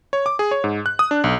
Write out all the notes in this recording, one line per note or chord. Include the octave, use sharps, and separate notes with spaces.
C#5
D6
G#4
C#5
G#2
F#6
D#6
D4
B1